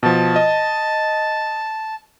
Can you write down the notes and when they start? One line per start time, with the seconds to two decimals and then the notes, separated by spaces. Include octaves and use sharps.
0.03 B2 F3 A5
0.36 D#5